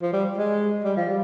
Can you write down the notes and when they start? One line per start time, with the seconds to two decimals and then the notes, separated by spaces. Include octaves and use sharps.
0.02 F3
0.13 G3
0.38 G#3
0.84 G3
0.96 F3
1.08 G3